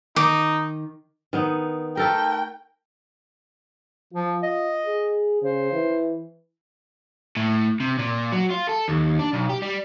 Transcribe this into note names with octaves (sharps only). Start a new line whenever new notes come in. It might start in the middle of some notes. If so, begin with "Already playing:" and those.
D#3 D#4 D6
D#3 B3 D#4
A3 A4 A#4 G5
F3 F4
D#5
G#4
C#3 C5
E3
A2
C3
A#2
F#3
F4
A4
D#2
D4
B1
G4
G3